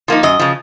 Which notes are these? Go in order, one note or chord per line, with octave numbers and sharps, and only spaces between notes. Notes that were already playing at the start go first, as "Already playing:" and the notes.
F3 A#3 D#4
F#2 D#5
C#3 F3